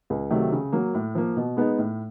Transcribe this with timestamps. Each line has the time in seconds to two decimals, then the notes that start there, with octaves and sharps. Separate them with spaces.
0.10 C#2
0.30 C3 D#3 F#3 A3
0.52 C#3
0.72 F#3 A#3
0.94 A2
1.15 F3 A#3
1.36 B2
1.57 G#3 B3 D#4
1.79 A2